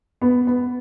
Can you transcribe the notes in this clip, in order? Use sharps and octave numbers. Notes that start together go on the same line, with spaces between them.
B3
B3